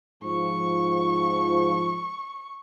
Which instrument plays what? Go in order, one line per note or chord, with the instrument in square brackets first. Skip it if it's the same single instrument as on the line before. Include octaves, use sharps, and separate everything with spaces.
[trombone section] G#2 F3 [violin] C#6